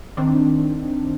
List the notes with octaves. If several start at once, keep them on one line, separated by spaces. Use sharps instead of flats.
D#3 C4 D4